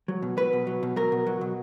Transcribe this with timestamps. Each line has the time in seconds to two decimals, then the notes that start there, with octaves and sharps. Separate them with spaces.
0.08 F#3
0.22 B2
0.37 F#3 B4
0.53 B2
0.67 F#3
0.83 B2
0.96 F#3 A#4
1.12 B2
1.27 F#3
1.41 B2